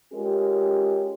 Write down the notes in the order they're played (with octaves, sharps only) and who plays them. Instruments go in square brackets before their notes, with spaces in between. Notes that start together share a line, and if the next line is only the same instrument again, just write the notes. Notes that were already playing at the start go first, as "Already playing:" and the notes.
[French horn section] G#3 C#4 F4 G4 A#4